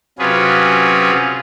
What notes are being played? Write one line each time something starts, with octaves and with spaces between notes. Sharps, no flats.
C3 F#3 C#4 F4 G#4 B4